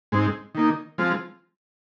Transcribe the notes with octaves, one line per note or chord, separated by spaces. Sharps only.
G#2 G#3 C4 D#4
D#3 A#3 D#4
F3 G#3 C4 F4